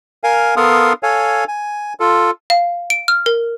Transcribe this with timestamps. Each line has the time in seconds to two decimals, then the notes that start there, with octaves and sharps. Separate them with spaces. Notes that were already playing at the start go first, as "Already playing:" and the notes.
0.24 A#4 F5 G#5
0.56 B3 A4 A#4 F5 C6 D#6
1.03 A4 C#5 F5 G#5
1.48 G#5
2.00 F4 A4
2.50 F5
2.90 D7
3.08 F6
3.26 A#4